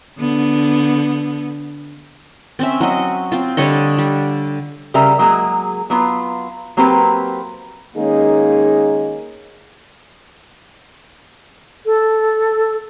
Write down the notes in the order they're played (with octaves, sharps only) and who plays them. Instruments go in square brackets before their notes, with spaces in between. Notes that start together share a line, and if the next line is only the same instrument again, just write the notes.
[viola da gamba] D3 B3
[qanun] C4 C#4 E5
F#3 F#4 D#5
C4 F4
D3 G3 C#5 D#5
G3
[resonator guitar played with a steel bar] C#3 G3 A#4 E5 A#5
F#3 G#3 A#3 G#4
F#3 B3 F4
F#3 A#3 C4 G4 B4
[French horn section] D#3 G#3 A#3 C#4 D#4 G#4
[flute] A4